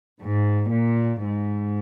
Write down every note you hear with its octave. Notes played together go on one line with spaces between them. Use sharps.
G#2
A#2
G#2